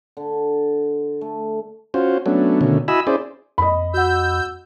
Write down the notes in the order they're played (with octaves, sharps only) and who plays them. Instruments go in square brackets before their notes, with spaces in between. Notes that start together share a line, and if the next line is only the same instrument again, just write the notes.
[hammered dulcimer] D3
A3
[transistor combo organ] C#4 F4 F#4 C5
F#3 A3 B3 C#4 D4
B2 D3 D#3 A3 C#4
E4 F#4 D#5 G#5 B5 E6
C#4 E4 G#4 C5 D5
[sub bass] F2 [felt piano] D#5 B5
[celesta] F#4 F#5 [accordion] E6 G6